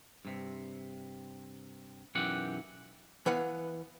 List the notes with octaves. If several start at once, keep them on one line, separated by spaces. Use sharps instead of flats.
G2 C3
B1 F#2 E3 G4 F#5
E3 B3 B4 F5 F#5